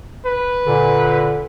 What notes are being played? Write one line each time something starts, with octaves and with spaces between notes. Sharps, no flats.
B4
A#2 D3